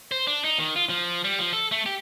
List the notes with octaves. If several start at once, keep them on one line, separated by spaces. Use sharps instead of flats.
C5
D4
D#4
D#3
F4
F3
G3
F3
A4
A3
G4